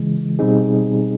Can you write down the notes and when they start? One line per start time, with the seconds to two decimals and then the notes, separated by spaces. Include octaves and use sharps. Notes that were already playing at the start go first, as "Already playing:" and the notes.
Already playing: C#3 E3 G#3
0.39 B2 G3 C4 D#4 G#4